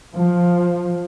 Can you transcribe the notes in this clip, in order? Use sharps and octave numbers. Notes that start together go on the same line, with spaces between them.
F3